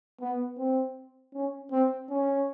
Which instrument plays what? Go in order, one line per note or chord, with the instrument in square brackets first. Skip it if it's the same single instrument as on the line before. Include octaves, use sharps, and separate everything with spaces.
[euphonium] B3
C4
C#4
C4
C#4